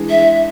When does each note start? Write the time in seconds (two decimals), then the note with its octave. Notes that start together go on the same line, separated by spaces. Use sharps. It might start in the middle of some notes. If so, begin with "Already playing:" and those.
Already playing: E3 G#3 D4 G#4
0.10 E5